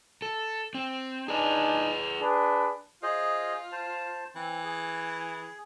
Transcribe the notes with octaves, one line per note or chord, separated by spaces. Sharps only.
A4
C4
D4 D#4 G#4 B4 G#5
D4 G#4 B4
F4 G#4 C5 D#5
C5 A5
E3 C4
G#4